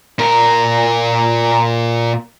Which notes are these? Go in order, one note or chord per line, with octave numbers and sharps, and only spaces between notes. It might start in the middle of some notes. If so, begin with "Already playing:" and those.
A#2 A#4